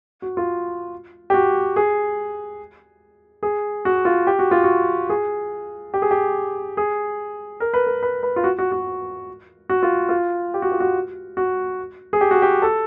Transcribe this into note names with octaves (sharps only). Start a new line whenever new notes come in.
F#4
F4
G4
F#4
G#4
G#4
F#4
F4
G4
F#4
F4
F#4
G#4
G4
G#4
G4
G#4
A#4
B4
A#4
B4
B4
F4
F#4
F#4
F#4
F#4
F4
F4
G4
F#4
F4
F#4
F#4
G#4
G4
F#4
G4
A4